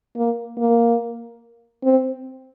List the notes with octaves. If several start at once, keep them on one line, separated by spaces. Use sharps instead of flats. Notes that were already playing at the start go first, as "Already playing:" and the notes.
A#3
A#3
C4